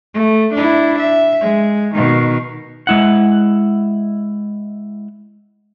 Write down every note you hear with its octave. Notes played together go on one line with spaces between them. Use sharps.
A3
D4 E4
E5
G#3
B2 D#3
G#3 E4 F#5